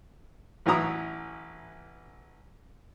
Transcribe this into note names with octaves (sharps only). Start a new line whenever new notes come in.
A1 E3 F#3 E4 A#5 D#6